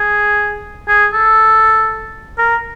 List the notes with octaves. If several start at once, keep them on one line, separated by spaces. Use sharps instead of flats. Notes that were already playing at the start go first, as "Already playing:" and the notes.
Already playing: G#4
G#4
A4
A#4